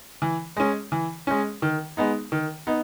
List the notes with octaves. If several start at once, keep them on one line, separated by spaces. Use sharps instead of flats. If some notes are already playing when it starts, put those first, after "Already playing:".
E3
G#3 C#4
E3
G#3 C#4
D#3
G#3 B3 D#4
D#3
B3 D#4